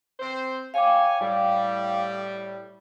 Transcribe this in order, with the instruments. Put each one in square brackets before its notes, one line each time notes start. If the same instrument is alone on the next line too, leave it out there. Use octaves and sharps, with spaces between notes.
[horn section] C4 C5
[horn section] C#5 G#5 [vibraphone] F5 G5 D6
[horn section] A2 G3